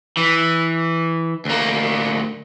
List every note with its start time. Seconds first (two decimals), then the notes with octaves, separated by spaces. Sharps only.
0.17 E3
1.45 D2 A#3